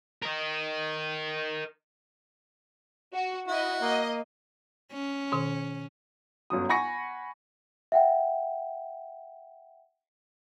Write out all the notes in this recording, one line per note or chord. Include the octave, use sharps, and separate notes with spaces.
A#4 D#5
F#4
E4 F#4 D#5
A#3 D#5
C#4
B2 D#3
G1 F#2 F#3 D#6
F#5 G#5 B5 C#6 A#6 C#7
E5 F#5 G5